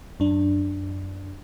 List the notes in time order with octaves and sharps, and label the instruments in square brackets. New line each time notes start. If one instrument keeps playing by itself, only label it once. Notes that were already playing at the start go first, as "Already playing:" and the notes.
[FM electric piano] F#2 D4